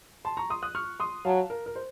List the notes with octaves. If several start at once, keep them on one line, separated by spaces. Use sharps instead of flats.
A5 C6
A#5 C#6
C6 D#6
D#6 F#6
C#6 F6
C6 D#6
F#3 F5 A5
A#4
A#4
C5